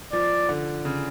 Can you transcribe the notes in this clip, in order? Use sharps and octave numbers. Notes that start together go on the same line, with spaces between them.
F3 D5
D3
C#3